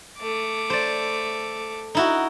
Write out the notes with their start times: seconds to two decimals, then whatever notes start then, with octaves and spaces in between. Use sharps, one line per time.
0.19 A3 D6
0.70 C5 D5
1.95 D#4 E4 F#4